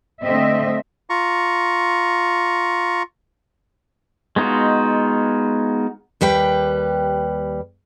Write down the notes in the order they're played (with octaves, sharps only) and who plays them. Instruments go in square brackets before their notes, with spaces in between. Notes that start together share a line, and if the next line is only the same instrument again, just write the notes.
[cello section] D3 A3 C4 D#5 E5
[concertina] F4 A#5 C#6
[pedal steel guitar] G#3 B3 D#4 F4 F#4
[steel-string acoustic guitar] D#2 G3 B4 G5